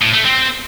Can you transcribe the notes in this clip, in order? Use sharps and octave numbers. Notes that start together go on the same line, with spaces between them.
A2
A3
C4